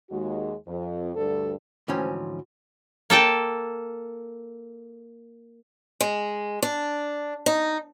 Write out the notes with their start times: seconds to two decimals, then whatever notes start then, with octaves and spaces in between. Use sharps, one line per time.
0.10 D#2 G#3 F#4
0.67 F2
1.16 D2 G2 A4
1.88 D2 G#2 E3 F3 C#4 G5
3.10 A#3 A4 G5 A5
6.01 G#3
6.63 D4
7.46 D#4